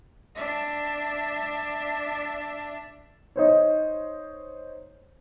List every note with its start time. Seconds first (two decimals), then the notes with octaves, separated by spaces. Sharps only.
0.36 D4 E5
3.36 D#4 C5 C#5